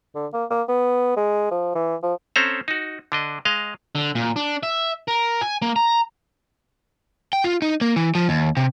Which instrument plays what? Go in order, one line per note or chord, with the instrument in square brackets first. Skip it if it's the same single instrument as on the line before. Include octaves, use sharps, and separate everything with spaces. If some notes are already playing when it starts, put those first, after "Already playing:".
[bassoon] D3
A#3
A#3
B3
G#3
F3
E3
F3
[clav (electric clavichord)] C4 C#4 A4 C5 A#5
D#4 F#4
D3 D4 D#5
G#3 D#5 F5
[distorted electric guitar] D3
A#2
D4
E5
A#4
G#5
A#3
A#5
[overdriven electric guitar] G5
F4
D#4
A#3
E3
F3
D#2
C3